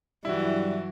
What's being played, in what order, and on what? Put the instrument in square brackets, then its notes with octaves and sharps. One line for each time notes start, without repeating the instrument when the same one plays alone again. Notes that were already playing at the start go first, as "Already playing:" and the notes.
[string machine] G2 F#3 [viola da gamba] E3 [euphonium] G3 [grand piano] E4 F#4